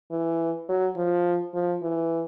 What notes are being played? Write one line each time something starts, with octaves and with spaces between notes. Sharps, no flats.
E3
F#3
F3
F3
E3